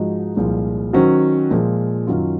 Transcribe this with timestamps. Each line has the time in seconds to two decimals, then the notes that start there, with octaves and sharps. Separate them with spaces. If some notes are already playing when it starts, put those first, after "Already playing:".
Already playing: G#2 F3 G#3 D#4 F#4
0.37 C2 A#2 F3 G#3
0.93 D#3 F#3 C#4 F#4 C5
1.51 A#2 F3 G#3
2.07 F#2 D#3 F#3 C#4 F4